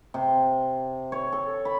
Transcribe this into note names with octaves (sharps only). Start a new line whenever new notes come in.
C3
C#5
A4
B5